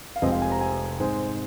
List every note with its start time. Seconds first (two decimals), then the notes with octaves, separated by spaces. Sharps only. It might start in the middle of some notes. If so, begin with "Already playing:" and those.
0.16 F5
0.22 F1 F2 C3 G#3 C4 D#5
0.32 F5
0.42 G#5
0.52 A#5
0.61 G#5
1.00 G#2 G#3 C4